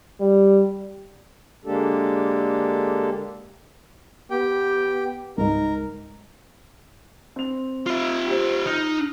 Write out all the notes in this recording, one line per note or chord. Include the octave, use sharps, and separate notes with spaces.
G3
D3 G#3 A#3 D4 G4 A4
B3 G4 G5
C#2 G#2 D#4 A#4
C4 F7
F4 E5
G4 C5
D#4 F6